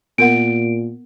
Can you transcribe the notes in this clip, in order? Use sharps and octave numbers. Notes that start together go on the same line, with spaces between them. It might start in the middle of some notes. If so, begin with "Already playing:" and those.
A#2 B3 A#4 F#5 D7